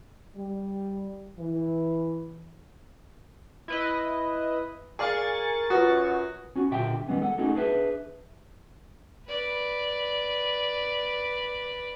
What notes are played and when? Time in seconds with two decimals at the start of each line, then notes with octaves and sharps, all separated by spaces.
0.36 G3
1.39 E3
3.68 E4 B4 D#5
4.99 G#4 A#4 D5 F5 G#5 C#6 A6
5.70 F#2 F4 F#4 B4 D#6
6.55 C#4 F#4
6.71 B1 A#2 D3 G4 E5 G5
7.07 D#3 G3 G#3 B3 C#4
7.22 A4 F#5
7.38 A3 C#4 D#4 F#4 G#4 A4
7.54 D4 G#4 A#4 B4 E5
9.27 B4 D5